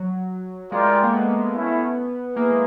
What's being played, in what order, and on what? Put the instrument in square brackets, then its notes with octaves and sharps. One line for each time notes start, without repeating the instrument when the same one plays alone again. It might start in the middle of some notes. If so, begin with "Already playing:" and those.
Already playing: [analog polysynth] F#3
[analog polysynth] G#3 [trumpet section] F4 A#4 D5 G5
[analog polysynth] A3
A3
A#3
B3
[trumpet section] A3 C#4 E4
[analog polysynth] A#3 [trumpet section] E4 G#4 B4
[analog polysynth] G#3